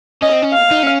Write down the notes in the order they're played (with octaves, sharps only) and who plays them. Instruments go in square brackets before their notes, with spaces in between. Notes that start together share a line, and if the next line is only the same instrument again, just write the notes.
[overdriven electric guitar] C#4 [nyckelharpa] D#5
[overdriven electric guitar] C4
C#4
[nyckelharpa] F5
[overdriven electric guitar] D#4
C#4